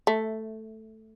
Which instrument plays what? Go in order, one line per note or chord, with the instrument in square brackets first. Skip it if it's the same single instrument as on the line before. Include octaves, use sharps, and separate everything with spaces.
[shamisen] A3